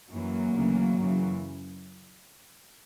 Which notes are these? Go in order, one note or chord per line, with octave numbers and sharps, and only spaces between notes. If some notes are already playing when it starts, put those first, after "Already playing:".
F#2 E3 F#3 A#3
D2 C#3 E3
F#2 C#3 E3